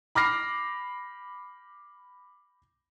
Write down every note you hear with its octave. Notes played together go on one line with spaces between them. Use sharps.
B5 D6 F6 A#6 C7